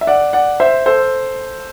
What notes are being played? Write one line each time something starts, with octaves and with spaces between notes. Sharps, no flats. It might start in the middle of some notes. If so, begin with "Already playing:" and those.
E5
D5 F#5
D5 F#5
C5 E5
A4 C5